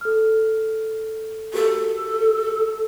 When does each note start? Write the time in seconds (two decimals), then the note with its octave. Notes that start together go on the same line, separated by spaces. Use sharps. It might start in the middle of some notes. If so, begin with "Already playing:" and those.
0.01 A4 F6
1.54 F#4 G4 A4 A#4